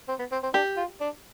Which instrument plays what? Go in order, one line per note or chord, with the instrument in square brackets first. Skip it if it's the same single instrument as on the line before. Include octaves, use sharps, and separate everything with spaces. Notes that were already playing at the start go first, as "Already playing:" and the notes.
[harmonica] C4
B3
C4
C4
[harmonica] D4 [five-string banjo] G4
[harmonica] F4
D4